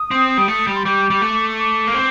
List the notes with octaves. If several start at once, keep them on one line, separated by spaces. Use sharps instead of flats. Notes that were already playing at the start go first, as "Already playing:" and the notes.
Already playing: D#6
C4
G3
A3
G3
C6
G3 D6
G3
A3
D6
A#3
C4